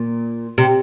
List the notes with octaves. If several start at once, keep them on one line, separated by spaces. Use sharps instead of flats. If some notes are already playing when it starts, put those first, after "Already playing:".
Already playing: A#2
C3